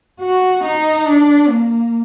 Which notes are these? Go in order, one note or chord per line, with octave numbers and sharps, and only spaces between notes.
F#4
D#4
D4
A#3